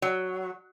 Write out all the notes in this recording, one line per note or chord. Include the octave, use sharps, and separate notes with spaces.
F#3